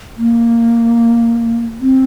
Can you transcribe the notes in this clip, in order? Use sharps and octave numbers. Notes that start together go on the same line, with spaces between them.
A#3
C4